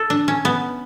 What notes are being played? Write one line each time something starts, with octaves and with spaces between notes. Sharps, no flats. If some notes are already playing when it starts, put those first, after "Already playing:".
Already playing: A4
D4
C#4
B3